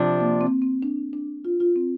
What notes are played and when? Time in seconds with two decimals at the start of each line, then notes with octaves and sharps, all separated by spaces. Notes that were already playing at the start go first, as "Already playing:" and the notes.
Already playing: C3 F3 D4
0.21 A#3
0.41 C4
0.62 C4
0.83 D4
1.13 D4
1.45 F4
1.60 F4
1.76 C4